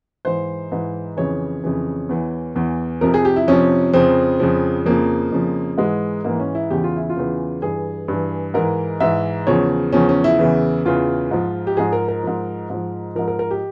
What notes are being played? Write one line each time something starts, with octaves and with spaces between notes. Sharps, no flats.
G#2 E3 C5
G#2 E3
F2 C#3 E3 C#5
F2 C#3 E3
E2 E3
E2 E3
F2 C3 F3 A#4
G#4
G4
E4
F2 C3 F3 C#4
F2 C#3 F3 C4
F2 C#3 F3
F2 C#3 F3 A#3
F2 C#3 F3
G#2 E3 G#3
G#2 E3 A#3
C#4
E4
E2 C#3 E3 G4
F4
E4
F4
E2 C#3 E3
G2 E3 G#4
G2 E3
G#2 E3 A#4
G#2 E3 E5
E2 C#3 F3 C#5
E2 C#3 F3 C#4
C#4
E4
E2 C#3 E3
E2 C#3 E3 F4
G#2 F3
G4
G#2 F3 G#4
A#4
A#4
G#2 F3
G#2 F3
G#2 F3 A#4
A#4
A#4
G4